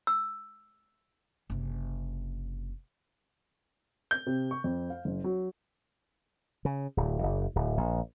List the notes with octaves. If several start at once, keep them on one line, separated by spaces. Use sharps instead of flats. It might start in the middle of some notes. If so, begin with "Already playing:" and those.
E6
F#1 C3
G6
C3
C#6
F2
F5
F#1
F#3
C#3
D1
F#1
D1
A#1